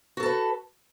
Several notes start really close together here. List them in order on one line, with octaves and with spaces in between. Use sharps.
F#4 A4 A5 B4